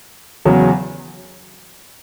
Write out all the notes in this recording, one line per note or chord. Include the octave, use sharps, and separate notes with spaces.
E2 C#3 F#3